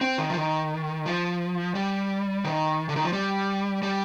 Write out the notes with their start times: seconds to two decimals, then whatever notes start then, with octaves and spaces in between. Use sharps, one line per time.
0.01 C4
0.18 D#3
0.30 F3
0.36 D#3
1.06 F3
1.75 G3
2.45 D#3
2.89 D3
2.96 D#3
3.05 F3
3.13 G3
3.83 G3